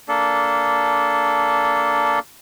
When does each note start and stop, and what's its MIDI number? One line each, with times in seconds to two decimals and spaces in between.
0.08 2.19 58
0.08 2.19 62
0.08 2.19 69